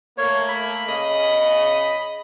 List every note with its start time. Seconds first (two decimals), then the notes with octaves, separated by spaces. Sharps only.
0.18 A3 A#3 C#5
0.49 B5
0.87 C#3 D#5